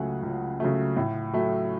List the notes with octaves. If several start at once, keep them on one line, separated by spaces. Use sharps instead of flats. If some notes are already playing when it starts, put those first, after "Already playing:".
Already playing: C#2 C#3 F#3 A3 F#5 G#5
C#2
C#3 F#3 A3
A2
F#3 A3